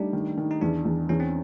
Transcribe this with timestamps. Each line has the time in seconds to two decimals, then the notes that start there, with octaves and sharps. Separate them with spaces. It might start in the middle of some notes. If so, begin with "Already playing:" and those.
Already playing: G3 A3 D4 D#4
0.13 D#3
0.37 D#3
0.51 D#4
0.61 E2 D4
0.85 E2
1.09 E2 C#4
1.20 C4